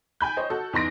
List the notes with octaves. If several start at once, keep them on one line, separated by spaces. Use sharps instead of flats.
G5 G#5 B5 G6
C5 C#5 D#5
F#4 A4
E2 D#4 C6 A#6 D7